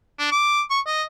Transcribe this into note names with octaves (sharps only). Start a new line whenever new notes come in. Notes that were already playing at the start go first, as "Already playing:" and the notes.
D4
D6
C#6
D#5